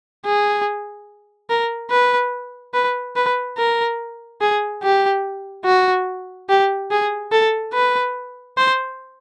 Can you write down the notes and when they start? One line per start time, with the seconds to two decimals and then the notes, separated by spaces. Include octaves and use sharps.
0.26 G#4
1.50 A#4
1.91 B4
2.74 B4
3.16 B4
3.58 A#4
4.41 G#4
4.83 G4
5.65 F#4
6.49 G4
6.91 G#4
7.32 A4
7.73 B4
8.57 C5